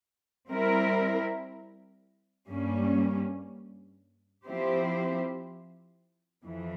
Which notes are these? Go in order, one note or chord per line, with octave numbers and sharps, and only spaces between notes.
G3 C4 E4 A#4
G2 G3 A#3 C#4
F3 C4 E4 G4 C5
F2 E3